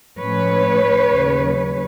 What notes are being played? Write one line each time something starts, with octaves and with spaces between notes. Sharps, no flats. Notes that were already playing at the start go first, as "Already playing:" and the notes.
A2 F3 A3 C#4 B4 C#5
D#2 C#3 F#3